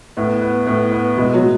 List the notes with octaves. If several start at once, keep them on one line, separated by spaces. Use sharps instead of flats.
A2 B3
B3
A2 B3
B3
B2 G#3
F#3
A2